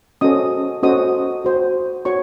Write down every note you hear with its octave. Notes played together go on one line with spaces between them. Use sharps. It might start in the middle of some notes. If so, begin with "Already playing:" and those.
C#4 F#4 A4 C5 D#5 D#6
C#4 F#4 A4 C5 D#5 D#6
F#4 C5
F#4 C#5 C#6